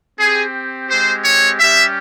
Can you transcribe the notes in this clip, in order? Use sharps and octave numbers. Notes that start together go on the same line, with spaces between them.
C4 G4 G#4
G#3 C4 G4 C5
C#5
G3 C#4 G4 E5